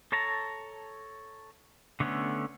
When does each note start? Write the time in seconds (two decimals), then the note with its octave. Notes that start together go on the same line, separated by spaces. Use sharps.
0.12 A4 C#5 A5 A#5
2.00 D3 A3 B3 C#4